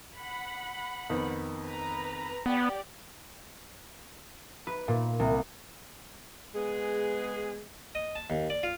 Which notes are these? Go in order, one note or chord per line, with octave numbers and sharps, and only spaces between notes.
F#5 B5
F2 D#3 B3
B4 A#5
B3 G4 D5 F#5
B4
A#2
C2
G#3 B3 G#4
D#5
A5
D#2
D5
F4